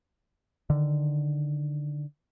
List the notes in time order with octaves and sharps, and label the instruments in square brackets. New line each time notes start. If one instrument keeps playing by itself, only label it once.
[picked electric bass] D3 D#3